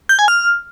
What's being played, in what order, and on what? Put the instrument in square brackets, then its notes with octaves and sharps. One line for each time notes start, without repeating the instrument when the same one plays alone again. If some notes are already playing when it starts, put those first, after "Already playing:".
[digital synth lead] G6
G#5
F6